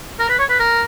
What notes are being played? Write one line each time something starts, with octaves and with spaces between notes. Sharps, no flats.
A#4
B4
C#5
B4
A#4